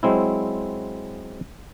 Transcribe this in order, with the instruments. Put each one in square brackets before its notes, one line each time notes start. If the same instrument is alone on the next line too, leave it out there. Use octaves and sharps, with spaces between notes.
[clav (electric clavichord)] F#3 G#3 C4 E4